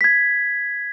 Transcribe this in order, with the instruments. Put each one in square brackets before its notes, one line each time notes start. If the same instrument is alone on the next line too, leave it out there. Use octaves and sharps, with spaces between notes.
[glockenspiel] G#6 B6